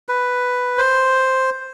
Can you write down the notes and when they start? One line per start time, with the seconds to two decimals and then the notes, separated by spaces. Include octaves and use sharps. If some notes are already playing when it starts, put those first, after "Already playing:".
0.09 B4
0.78 C5